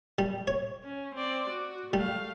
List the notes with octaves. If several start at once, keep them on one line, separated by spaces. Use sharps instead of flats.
G3
C#5
C#4
C4 D5
F#4
G3 A3 F5